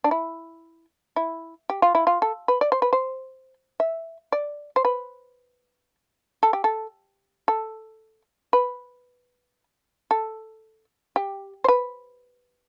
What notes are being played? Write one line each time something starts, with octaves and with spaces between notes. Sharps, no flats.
D4
E4
E4
G4
F4
E4
F4
A4
B4
D5
C5
B4
C5
E5
D5
C5
B4
A4
G4
A4
A4
B4
A4
G4
C5
B4